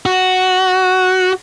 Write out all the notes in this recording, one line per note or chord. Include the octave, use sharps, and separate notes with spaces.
F#4